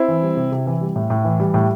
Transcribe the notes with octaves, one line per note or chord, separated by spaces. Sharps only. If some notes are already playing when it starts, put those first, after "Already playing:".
Already playing: C4 E4
E3
G3
C3
C3
E3
G3
A2
A2
E3
G3
A2